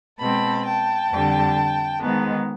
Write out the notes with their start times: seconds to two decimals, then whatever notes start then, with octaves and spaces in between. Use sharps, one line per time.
0.19 B2 G#3 C4 A5 B5
0.65 G5 A5
1.10 F2 D3 G3
2.01 G#2 D#3 G#3 B3